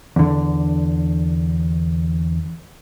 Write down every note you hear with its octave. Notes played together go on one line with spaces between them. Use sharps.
E2 D3